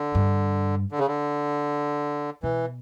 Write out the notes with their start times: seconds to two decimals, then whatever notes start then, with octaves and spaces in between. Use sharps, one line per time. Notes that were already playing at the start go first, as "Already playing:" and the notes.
Already playing: D3
0.15 G2
0.91 D3
0.98 C#3
1.07 D3
2.43 B2 E3